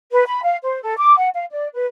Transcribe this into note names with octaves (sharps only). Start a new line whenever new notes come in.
B4
B5
F5
C5
A4
D6
F#5
F5
D5
B4